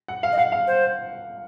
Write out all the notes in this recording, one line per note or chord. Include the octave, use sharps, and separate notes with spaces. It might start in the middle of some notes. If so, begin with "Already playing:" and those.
F#5
F5
D#5
F5 F#5
F5
C5